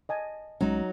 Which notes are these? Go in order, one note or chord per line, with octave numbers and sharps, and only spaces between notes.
D#5 G#5 A5
B1 F#3 G#3 C#4 D#4